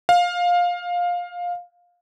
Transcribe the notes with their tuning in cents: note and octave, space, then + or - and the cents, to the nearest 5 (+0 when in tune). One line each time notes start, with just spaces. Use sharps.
F5 +15